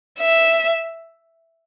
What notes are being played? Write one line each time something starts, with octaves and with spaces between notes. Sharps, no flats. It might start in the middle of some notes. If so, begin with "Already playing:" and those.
E5